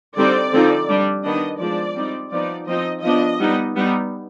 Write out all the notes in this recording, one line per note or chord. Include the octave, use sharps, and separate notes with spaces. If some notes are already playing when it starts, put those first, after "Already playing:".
D3 G3 C4 D#4 D5
D3 F3 C4 D#4
G3 D4
D#3 B3 D4 D#5
F3 G#3 D4 D5
G3 C4 D#4
F3 B3 D#4 D5
F3 C4 D#4 D#5
F3 B3 D4 D#5
G3 B3 D#4
G3 B3 D#4